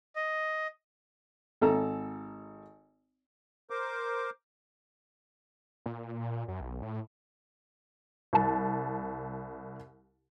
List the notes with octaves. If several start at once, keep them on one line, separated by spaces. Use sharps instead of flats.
D#5
G#1 A4 A#5
A#4 C5 D6
A#2
F#2
B1
A2
C2 A5